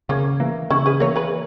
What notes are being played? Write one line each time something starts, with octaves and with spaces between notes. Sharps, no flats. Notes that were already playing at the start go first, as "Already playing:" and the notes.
C#3 A#3 C#4
E3 A#3
C#3 C#4 E4
G#4 B4
E3 A#3 A#4 C#5
G#4 B4